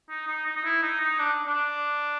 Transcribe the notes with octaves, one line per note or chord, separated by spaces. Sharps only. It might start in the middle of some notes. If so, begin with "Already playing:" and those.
D#4
D#4
D#4
D#4
E4
D#4
D#4
D4
D4